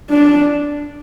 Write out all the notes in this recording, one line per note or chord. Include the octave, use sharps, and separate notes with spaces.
D4